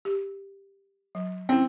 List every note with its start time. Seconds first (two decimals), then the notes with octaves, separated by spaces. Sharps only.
0.05 G4
1.15 F#3
1.49 C4 C#4 E4